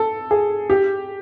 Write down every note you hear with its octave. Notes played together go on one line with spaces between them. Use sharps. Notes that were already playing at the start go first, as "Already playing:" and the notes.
Already playing: A4
G#4
G4